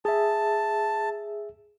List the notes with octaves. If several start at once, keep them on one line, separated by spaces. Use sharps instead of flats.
G#4 E5 A5